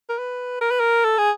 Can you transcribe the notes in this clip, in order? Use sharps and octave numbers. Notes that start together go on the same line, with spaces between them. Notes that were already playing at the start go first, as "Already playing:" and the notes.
A#4
B4
A#4
B4
A#4
A4
G#4